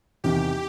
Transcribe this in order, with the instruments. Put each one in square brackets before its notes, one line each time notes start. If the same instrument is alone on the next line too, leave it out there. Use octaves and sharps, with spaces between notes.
[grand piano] E2 C3 D#3 [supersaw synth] G4